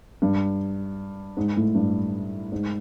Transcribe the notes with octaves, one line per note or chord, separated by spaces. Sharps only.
G2
G#2
A2
G2
G#2